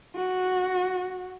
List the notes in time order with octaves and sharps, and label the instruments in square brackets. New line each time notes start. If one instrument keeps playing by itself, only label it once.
[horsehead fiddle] F#4